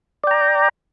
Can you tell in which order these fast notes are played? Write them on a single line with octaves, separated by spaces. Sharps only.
D5 G5 A#5